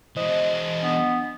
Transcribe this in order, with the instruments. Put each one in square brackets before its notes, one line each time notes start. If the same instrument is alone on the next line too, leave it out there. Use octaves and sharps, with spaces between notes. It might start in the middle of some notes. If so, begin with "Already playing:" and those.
[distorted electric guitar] E3 G#3 [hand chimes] C5 [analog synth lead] D#5
[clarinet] B3 [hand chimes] D4